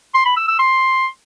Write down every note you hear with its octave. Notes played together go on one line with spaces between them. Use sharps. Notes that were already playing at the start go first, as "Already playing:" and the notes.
C6
B5
E6
E6
C6